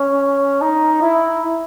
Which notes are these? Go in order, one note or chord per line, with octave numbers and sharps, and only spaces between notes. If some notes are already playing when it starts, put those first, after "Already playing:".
Already playing: C#4
D#4
E4